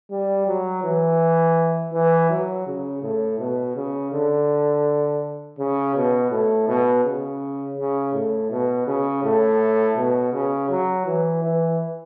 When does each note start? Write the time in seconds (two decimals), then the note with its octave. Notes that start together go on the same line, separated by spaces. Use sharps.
0.11 G3
0.47 F#3
0.84 E3
1.93 E3
2.30 F#3
2.67 C#3
3.02 A2
3.39 B2
3.76 C#3
4.12 D3
5.59 C#3
5.96 B2
6.31 A2
6.68 B2
7.05 C#3
7.78 C#3
8.14 A2
8.51 B2
8.87 C#3
9.24 A2
9.97 B2
10.33 C#3
10.70 F#3
11.06 E3
11.43 E3